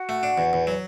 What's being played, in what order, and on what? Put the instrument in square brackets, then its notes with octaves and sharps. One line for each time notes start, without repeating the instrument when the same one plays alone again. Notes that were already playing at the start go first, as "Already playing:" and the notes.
Already playing: [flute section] F#4 F#5
[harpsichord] A3
D4
E2
E2
F#3